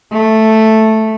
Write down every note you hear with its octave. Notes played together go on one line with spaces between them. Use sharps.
A3